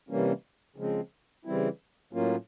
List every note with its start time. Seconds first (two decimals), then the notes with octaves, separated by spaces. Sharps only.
0.09 C3 E3 G3 A#3 C#4
0.76 C#3 F3 G#3 C4
1.45 C#3 E3 G3 C4 E4
2.13 A2 F#3 A#3 C#4 F4